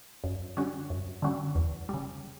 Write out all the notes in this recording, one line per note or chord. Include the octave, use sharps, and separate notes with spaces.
F#2
D3 G3 C#4 F#4
F#2
D3 G3 C#4 F#4
E2
C#3 G3